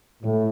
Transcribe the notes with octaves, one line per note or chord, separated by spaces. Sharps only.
A2